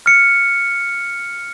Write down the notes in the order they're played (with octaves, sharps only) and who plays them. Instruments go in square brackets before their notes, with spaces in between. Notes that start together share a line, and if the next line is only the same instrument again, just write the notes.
[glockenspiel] F6 C#7